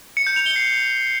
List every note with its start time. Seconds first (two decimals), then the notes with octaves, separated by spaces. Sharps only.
0.17 C#7
0.27 G6
0.36 F7
0.46 G7
0.56 C7